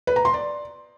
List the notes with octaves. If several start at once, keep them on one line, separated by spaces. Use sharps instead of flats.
B4
A#5
C6
D5